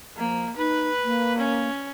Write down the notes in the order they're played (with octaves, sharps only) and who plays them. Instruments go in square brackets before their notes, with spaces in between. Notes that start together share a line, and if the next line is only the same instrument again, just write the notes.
[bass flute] F3 [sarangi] A#3
[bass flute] D#4 [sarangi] B4
[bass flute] A#3
[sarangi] C#4